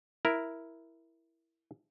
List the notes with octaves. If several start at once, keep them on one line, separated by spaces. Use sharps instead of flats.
E4 A#4